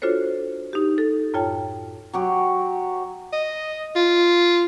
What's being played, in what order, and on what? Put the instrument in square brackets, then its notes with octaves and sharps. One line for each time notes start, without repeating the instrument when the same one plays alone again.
[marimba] D4 F4 F#4 A4 C5 C#5
D#4 G4
A4
F#2 A2 F4 C#5 G5 A5
[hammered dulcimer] F#3 F#4 G4
[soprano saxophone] D#5
F4